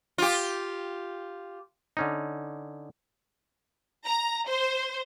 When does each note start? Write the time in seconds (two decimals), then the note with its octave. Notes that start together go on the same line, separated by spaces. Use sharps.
0.18 F4 G4
1.97 D3 C#4 D#4
4.05 A#5
4.47 C5